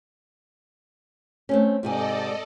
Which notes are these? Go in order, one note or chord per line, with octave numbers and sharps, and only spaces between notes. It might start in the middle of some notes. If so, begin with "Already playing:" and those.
A3 C4 C#4
G#2 C3 A4 D5 D#5 G#5